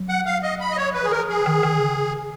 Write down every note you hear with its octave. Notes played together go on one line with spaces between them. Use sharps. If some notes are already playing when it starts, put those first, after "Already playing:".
Already playing: F#3
F#5
F5
D#5
B5
D#5
C#5
F3 B4
G#4
D#3 A#4
F3
G#4
C#3
D#3
D#3
C#3